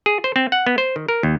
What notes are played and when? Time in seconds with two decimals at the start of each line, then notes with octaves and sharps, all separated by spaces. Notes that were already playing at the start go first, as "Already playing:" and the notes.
0.06 G#4
0.24 C5
0.36 C4
0.52 F#5
0.67 B3
0.78 C5
0.96 D#3
1.08 A#4
1.23 D#2